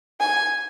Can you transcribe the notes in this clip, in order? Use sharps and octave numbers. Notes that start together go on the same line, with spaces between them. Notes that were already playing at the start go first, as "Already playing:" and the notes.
G#5